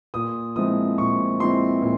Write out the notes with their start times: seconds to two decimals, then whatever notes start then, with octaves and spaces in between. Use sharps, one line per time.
0.14 A#2 D#6
0.56 F3 G#3 C4 E4 D#6
0.98 A#2 C#6
1.40 F3 G#3 C4 E4 C6
1.82 A#2